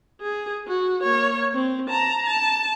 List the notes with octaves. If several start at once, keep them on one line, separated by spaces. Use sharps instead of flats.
G#4
F#4
A#3 C#5
C4
A5 A#5
A5